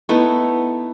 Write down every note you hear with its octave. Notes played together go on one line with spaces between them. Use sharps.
A3 B3 D#4 E4